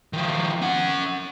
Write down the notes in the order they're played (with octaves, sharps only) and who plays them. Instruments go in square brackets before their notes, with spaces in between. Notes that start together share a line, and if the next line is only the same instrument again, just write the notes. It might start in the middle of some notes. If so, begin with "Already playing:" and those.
[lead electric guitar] D#3 F3
C#4 F#5